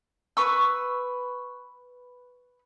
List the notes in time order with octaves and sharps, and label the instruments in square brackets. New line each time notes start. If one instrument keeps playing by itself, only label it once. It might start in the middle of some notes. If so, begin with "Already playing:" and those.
[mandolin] B4 C#6 E6